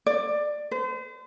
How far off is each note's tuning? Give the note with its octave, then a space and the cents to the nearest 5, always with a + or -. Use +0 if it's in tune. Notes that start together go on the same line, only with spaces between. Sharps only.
D5 +15
C5 -40